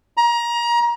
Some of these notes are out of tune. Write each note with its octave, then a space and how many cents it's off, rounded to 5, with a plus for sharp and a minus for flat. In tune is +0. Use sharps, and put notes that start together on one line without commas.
A#5 +25